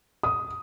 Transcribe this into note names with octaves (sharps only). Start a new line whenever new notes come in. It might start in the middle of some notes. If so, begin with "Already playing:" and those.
D#6